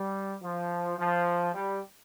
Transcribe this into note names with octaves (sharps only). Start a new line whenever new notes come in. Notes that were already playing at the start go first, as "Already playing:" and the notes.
Already playing: G3
F3
F3
G3